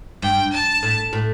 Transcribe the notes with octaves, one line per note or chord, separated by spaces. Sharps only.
G2 G5
A5
A2
A2